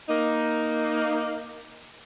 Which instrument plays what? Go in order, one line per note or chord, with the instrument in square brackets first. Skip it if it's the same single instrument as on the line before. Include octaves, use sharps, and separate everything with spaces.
[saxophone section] A#3 D#4